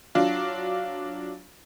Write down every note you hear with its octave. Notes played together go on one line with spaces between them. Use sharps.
F#3 D4 F4